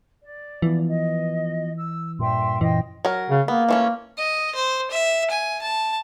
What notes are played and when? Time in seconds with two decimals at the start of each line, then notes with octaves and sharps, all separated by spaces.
0.23 D5
0.62 E3 F3 B3
0.87 D#5
1.77 E6
2.19 G2 A#2 E5 G5 C6
2.61 F#2 A#2 E3 C5 D#5 G5
3.05 F#3 A#4
3.30 C#3
3.48 A#3 B3
3.69 E3 A3 C#4
4.17 D#5
4.55 C5
4.91 E5
5.30 G#5
5.62 A5